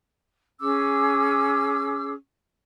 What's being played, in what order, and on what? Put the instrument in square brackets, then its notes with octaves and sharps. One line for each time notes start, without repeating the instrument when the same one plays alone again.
[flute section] C#4 G#4 D6 E6